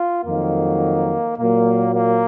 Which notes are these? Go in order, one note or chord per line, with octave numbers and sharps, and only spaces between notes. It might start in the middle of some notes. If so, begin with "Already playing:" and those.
Already playing: F4
F2 D#3 F#3 A#3
A#2 F#3 A#3
A#3